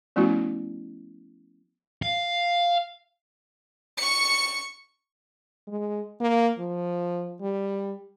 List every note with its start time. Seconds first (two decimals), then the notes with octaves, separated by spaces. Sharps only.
0.16 F3 A3 B3 C#4 E4 F#4
2.02 F5
3.98 C#6 C#7
5.67 G#3
6.21 A#3
6.59 F3
7.41 G3